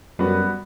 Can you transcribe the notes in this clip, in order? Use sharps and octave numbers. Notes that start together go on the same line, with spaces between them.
F#2 G3 B3 F#4 B4